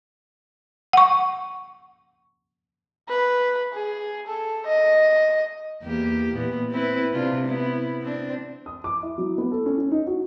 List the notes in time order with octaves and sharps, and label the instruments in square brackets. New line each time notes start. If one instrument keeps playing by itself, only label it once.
[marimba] F#5 C#6
[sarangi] B4
G#4
A4
D#5
[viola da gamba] E2 A#3 G4
A#2 E3 B3
C4 E4 B4
C3 D4 F4
B3 E4
C4 D4
[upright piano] D#6
D6
E4
F#3
B3
A4
C#4
C#4
D#4
F#4